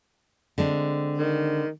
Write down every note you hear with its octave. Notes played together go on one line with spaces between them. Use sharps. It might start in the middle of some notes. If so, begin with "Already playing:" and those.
D3 G#3 C4
D#3